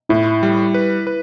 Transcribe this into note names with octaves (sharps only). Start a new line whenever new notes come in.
A2 E4
G3
B4
B4